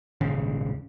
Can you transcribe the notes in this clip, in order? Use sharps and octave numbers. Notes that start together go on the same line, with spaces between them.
D#1 G#1 C#3